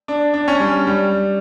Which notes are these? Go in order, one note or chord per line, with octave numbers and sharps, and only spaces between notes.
D4
D4
C#4
G3
G3